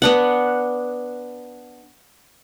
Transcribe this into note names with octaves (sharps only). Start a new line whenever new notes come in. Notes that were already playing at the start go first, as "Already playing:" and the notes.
B3 D4 F#5